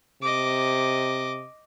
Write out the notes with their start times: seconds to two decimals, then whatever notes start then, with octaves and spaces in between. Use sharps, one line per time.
0.22 C3 D#5 D6